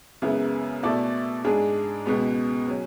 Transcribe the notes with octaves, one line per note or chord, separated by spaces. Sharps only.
F#2 C#3 G#3 B3 E4
B2 A3 E4 A4 D5
G#2 G#3 D4 G#4
C#2 B2 G#3 B3
F#3 C#4